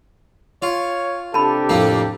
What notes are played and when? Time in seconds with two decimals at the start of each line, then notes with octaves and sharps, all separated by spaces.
0.62 F4 C#5
1.34 C3 D4 G4 A4 A5 B5
1.69 F2 A2 A#3